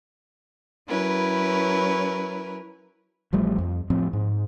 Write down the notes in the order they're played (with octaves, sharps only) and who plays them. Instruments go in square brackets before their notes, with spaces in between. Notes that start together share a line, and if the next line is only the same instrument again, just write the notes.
[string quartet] F#3 C#4 E4 A#4 B4
[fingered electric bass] A1 F3 G3 A3
F2
A2 F3 C4
G#2